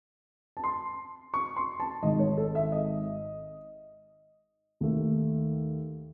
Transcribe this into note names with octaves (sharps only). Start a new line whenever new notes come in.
A5
C6
C#6
C6
A5
G#1 G#2 D#3 D#5
C#5
A4
E5
D#5
D#2 D#3 A3